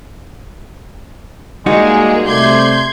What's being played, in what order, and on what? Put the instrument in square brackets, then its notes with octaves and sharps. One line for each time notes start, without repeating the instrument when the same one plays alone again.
[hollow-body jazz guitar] G3 D#4 F#4 [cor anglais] G#3 [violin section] A#3 G#4
[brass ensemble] C3 A3 [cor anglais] D5 [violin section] C6 G6 G#6